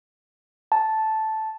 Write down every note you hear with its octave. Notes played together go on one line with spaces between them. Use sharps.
A5